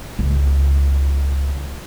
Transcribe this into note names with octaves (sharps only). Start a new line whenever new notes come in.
C#2 A#3